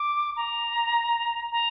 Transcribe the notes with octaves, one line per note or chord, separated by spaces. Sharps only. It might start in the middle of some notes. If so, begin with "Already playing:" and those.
Already playing: D6
A#5
A#5